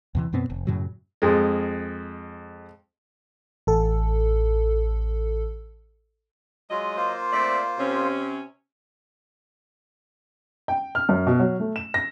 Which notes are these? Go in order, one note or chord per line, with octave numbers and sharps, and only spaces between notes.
E2 C3 E3
F#2 B2 B3 C4
F1
F#2 A2 C#3 F#3
F2 G#3
A1 A4
F#3 G#3 F4 D#5
A#3 F4 C5
A3 C4 D5
C3 C#4
G5
F6
F#2
B2
F#3
A3
E7
A#6